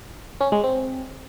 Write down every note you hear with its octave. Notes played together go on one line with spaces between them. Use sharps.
C#4
G#3
C4